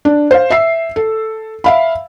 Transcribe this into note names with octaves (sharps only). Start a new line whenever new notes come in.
D4
C5 F5
E5 E6 C7
A4
E5 F5 B5